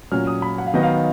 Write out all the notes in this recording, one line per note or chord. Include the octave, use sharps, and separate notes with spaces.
A#2 F#3 C#4 F6
D#6
B5
F#5
F5
D#3 F#3 B3 D#4 D#5
F5